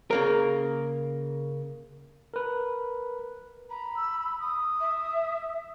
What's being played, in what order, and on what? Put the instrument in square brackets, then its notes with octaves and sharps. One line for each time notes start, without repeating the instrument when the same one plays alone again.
[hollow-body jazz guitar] C#3 A#3 A#4
[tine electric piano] A#4 B4
[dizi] A#5 [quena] B5
[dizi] E6
D#6
[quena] E5